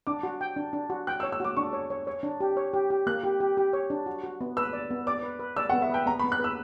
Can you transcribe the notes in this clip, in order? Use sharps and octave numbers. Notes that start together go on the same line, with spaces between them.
D4 D6
F#4
G5
D4
D4
F#4
G5 F#6
E6
C#5
E6
F#4 D6
D4 C#6
C#5
C#5
C#5
D4
G4
C#5
G4
G4
A#3 F#6
G4
G4
G4
C#5
D4
F#4
F#4
B3
B4 E6
D5
B3
D5 D6
B4
B4
D5 E6
F#5
B3
E5
B4 G5
B3 A#5
B5
B3
F#6
B4 E6